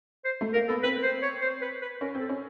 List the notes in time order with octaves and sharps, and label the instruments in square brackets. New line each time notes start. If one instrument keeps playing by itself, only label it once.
[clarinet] C5
[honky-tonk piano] A3
[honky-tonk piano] A#3 [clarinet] A#4
[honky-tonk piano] B3 [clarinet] A4
[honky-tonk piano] C4 [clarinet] B4
[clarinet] C5
C#5
C5
B4
B4
[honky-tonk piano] C#4 [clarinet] A#4
[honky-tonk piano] C4
[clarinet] A4
[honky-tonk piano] C#4